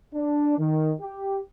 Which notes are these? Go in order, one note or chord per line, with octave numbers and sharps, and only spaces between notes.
D4
D#3
G4